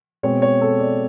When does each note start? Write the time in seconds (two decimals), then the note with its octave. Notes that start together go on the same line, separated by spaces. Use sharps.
0.23 B2 G#3 C4 C#5
0.42 C#5
0.62 A4
0.79 D5